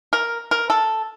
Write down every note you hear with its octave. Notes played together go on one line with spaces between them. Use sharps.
A#4
A#4
A4